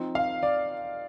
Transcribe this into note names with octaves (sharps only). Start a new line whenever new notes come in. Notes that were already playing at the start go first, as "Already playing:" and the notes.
Already playing: F3 C4 D#4
F5
D5